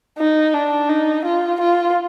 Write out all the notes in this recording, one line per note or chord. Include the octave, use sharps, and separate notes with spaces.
D#4
D4
D#4
F4
F4